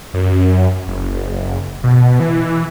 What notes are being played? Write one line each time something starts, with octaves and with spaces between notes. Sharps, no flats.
F#2
F#1
B2
E3